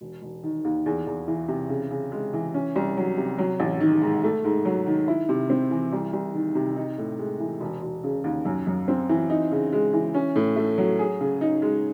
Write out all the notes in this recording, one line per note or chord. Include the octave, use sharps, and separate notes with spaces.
E1
E1
D#3
D#2
E2
E2
E3
C3
C#3
C#3
G#3
E3
C#4
C2
F#3
C3
F#3
A1
D#3
G#2
A3
G#2
F#3
D#3
E4
C3
C4
E3
C2
C2
D#3
C3
D#4
A2
G#3
E3
E1
E1
C#3
D#2
F#2
F#2
C4
E3
D#4
C#3
G#3
E3
C#4
A2
A3
F#3
G#4
C#3
D#4
G#3